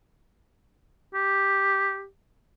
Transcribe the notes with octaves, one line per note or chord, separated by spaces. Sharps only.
G4